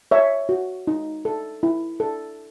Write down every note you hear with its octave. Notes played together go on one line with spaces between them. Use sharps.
C#5 E5
F#4
D#4
A4
E4
A4